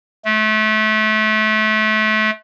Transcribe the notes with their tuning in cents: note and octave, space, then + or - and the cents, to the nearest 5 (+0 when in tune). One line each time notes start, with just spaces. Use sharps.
A3 -30